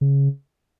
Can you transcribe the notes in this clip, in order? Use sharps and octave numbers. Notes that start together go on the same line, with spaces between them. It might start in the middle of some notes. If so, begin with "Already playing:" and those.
C#3